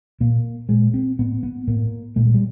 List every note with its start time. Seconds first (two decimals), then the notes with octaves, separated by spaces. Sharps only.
0.20 A#2 A#3
0.69 A#2 G#3
0.94 C4
1.19 A2 B3
1.43 B3
1.68 A2 A#3
2.16 A#2 A3
2.25 G#3
2.34 G3